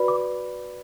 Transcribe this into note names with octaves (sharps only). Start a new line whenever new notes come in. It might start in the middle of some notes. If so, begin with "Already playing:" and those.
Already playing: F#4 B4 D5 B5
D6